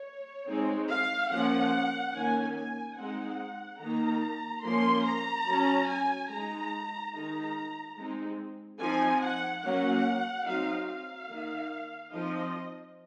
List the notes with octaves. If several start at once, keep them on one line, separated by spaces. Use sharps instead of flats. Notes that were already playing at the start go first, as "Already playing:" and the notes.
Already playing: C#5
G#3 C4 D#4
F5
F3 A#3 C#4 F#5
D#3 A#3 C#4 G#5
G#5
G#3 C4 D#4 F#5
D#3 A#3 D#4 A#5
F3 A#3 C#4 C6
A#5
F#3 C#4
G#5
G#3 D#4 A#5
D#3 G#3 D#4 A#5
G#3 C4 D#4
F3 C4 D#4 G#5
F#5
F#3 A#3 C#4 F#5
F#3 C4 D#4 F5
F5
D#3 A#3 D#4
F3 C4 D#4 D#5